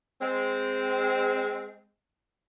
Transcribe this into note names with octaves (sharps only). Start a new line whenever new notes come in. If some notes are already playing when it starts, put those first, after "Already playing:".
G#3 C4